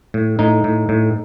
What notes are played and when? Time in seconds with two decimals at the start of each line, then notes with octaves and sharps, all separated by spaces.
0.14 A2
0.39 A2 D#4
0.64 A2
0.89 A2